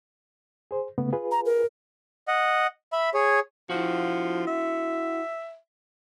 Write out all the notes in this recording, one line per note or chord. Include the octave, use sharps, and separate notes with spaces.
G#4 C5
C#3 A3 B3
F4 G#4 B4
A#5
A#4
D#5 F#5
E5 B5
G#4 C#5
F3 E4 F#4
E5